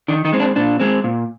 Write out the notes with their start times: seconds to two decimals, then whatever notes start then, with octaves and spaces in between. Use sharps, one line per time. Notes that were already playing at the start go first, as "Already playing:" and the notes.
0.08 D#3 D4
0.25 D#3 D#4
0.33 G#3 C4
0.40 D4
0.56 A#2 D4
0.80 G#3 C4
1.04 A#2